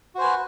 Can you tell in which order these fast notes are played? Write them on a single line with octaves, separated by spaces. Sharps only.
F#4 C5 G#5 B4